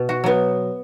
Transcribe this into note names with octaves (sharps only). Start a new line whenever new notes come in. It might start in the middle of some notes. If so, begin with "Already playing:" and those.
Already playing: B2
F#4
F#3 B3